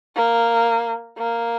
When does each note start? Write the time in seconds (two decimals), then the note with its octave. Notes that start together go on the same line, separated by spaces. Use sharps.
0.16 A#3
1.17 A#3